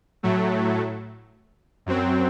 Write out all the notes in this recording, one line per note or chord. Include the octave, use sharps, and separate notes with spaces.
A2 F#3 A3
F#2 F#3 C4